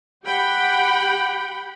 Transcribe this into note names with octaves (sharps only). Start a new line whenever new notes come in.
G4 F#5 G5 B5